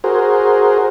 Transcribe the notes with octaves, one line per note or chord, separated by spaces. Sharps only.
F#4 G#4 A#4 C5